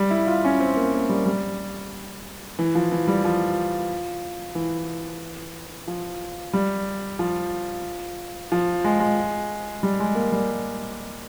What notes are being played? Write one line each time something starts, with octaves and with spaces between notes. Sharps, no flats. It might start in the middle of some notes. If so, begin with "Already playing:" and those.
Already playing: G3
E4
F4
C#4
C4
A#3
A#3
G3
G3
E3
F3
E3
G3
F3
E3
F3
G3
F3
F3
G#3
G#3
G3
G#3
A#3
G3